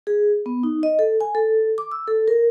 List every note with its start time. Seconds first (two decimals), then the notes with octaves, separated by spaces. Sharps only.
0.07 G#4
0.46 B3
0.63 D#4
0.83 D#5
0.99 A4
1.21 G#5
1.35 A4
1.78 D6
1.91 E6
2.08 A4
2.28 A#4